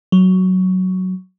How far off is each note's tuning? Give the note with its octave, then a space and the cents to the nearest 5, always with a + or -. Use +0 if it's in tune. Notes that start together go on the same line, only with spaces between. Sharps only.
F#3 +5